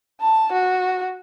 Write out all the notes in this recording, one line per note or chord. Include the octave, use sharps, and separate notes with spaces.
A5
F#4